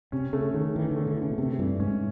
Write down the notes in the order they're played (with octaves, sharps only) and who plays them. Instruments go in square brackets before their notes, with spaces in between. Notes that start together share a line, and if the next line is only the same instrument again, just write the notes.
[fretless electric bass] C3 [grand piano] C#4
[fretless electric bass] C#3 [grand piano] A3
[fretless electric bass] D#3 [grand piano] A3
[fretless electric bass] D#3 [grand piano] E3
[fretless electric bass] D3
[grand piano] A3
[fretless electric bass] D3
[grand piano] E3
[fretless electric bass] C#3
B2
[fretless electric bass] C3 [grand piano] A3
[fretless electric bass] G2 [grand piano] E3
[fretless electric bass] G#2 [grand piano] C#4